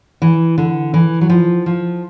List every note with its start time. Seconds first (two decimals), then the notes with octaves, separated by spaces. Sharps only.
0.22 E3
0.58 D3
0.94 E3
1.21 F#3
1.30 F3
1.66 F3